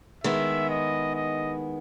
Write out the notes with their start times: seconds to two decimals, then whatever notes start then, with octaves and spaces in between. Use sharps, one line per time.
0.24 D#3 G#3 B3 E4 E5
0.70 D#5
1.15 D#5